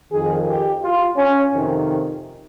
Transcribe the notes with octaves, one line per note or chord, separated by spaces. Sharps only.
F2 D#3 G#4
G4
F4
C#4
F2 C3 D#3